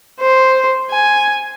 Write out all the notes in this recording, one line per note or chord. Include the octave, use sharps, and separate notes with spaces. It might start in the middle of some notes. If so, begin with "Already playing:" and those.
C5
G#5